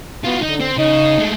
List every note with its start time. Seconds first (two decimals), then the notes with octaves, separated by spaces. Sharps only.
0.25 B3 F4 F#4
0.43 D3 D#4
0.61 C4
0.78 C#3 D#4
1.18 G#3 A3